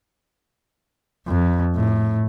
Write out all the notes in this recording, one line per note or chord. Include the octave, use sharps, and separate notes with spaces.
F2
A2